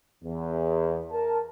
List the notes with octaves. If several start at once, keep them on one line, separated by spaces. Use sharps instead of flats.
E2
A#4 A5